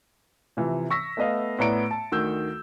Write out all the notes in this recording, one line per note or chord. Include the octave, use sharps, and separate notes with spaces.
C3 E3 F3
C#6 E6 A#6 B6
A3 B3 D#5 F5
A2 B3 D5 A#5 C#7 D7
A5
D2 D#3 E6 G6